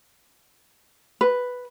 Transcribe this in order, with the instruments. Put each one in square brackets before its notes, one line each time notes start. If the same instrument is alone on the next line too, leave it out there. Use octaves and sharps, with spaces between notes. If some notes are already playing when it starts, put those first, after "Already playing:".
[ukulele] B4